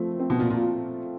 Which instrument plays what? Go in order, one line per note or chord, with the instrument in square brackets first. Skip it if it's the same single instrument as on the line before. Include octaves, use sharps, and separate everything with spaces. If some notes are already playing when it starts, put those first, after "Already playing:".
Already playing: [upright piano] F3 A3 C4
C4
[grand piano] B2
A#2
[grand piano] A#2 [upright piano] F4